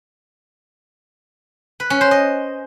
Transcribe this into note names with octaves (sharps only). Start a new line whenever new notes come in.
B4
C#4
C5
D#5